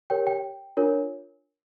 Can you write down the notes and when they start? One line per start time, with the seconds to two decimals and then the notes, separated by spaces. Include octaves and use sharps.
0.10 G4 A#4 C#5 G5
0.27 G5
0.77 D4 F4 A#4 C#5